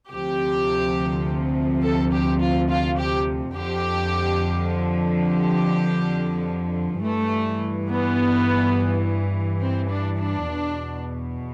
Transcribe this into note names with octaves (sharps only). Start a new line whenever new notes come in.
D2 C3 F3 G4
A4
G4
F4
F4
G4
F2 D3 F3 G4
G4
G2 E3 A3
B3
C4
D4
D4
E2 B2